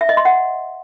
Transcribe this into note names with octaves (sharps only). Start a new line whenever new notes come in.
E5
D#5
C6
F#5